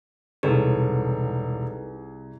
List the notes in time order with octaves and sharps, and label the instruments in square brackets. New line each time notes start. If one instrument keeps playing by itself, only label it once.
[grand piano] E1 C#5 [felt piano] C2 G#4 [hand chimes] D#4 A4 B4